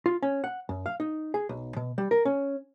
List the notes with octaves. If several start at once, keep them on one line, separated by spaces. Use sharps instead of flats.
F4
C#4
F#5
F#2
F5
D#4
G#4
B1
B2
G3
A#4
C#4